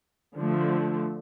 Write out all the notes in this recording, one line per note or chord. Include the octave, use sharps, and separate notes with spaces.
D3 F3 A3